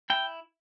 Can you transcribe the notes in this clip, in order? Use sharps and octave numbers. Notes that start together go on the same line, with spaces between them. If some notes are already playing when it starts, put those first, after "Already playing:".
E4 G5